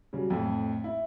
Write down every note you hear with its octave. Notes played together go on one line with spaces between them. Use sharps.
C#3 F#3 G3
F2 A2
E4